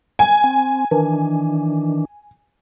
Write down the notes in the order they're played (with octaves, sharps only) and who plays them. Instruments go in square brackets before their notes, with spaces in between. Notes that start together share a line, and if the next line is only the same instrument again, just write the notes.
[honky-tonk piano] G#5
[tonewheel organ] C4
D#3 E3 D4